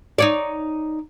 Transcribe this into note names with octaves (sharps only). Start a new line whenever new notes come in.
D#4 C#5 D5